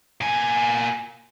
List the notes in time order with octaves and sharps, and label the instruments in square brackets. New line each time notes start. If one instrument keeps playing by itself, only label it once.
[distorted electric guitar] A#2 G#5